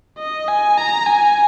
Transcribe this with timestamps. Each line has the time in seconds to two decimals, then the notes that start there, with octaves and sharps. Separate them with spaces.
0.18 D#5
0.48 G#5
0.78 A#5
1.06 G#5